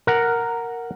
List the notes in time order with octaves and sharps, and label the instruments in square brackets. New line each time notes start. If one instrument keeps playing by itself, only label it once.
[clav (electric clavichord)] A#4 F#5